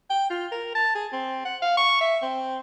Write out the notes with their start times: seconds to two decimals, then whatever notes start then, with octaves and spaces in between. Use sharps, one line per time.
0.10 G5
0.30 F4
0.52 A#4
0.75 A5
0.95 G#4
1.12 C4
1.45 F#5
1.62 F5
1.77 C#6
2.01 E5
2.22 C4